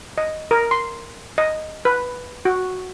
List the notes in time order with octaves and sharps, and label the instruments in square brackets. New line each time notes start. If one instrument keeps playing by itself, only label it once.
[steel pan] D#5
A#4
C6
D#5
B4
F#4